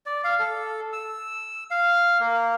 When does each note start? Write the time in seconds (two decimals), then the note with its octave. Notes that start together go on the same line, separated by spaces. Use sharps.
0.06 D5
0.24 F5
0.39 A4
0.93 E6
1.71 F5
2.20 A#3